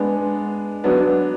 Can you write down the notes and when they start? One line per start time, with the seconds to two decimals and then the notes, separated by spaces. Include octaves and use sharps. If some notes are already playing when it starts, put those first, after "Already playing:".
Already playing: G#3 B3 D4
0.84 F#3 B3 D4